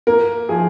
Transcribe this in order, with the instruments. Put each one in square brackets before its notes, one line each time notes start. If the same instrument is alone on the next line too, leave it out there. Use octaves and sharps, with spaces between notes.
[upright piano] A#3 A#4
F3 G#4